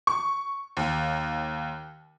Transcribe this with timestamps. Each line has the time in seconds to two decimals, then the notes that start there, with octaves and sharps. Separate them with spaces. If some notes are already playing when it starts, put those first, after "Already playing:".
0.07 C#6
0.77 D#2